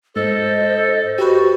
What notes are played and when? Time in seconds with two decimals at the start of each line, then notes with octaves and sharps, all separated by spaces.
0.16 G#2 A4 C5 D#5
1.18 F#4 G4 B4